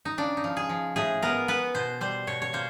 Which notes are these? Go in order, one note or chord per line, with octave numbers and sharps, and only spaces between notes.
D#4
C#3 D4
D#4
F3
G#4
F3
A2 G#4
B3 A#4
B3 B4
B2 C5
G3 C5
B2 C#5
C#5
A#3 C5